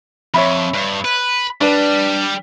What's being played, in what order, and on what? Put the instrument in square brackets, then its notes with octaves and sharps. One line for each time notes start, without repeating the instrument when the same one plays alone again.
[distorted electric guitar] F2 [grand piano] C#5 E5 B5
[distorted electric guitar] G2
B4
[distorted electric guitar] G3 [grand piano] D4 B4